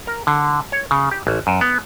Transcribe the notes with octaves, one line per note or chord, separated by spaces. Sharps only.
A#4
D3
C#5
C#3
G4
A1
F#2
B3